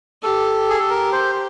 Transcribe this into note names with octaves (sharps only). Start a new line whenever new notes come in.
G4 A4
G#4
A4
A#4
C5